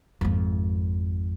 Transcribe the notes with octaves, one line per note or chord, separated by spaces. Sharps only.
G#1 F2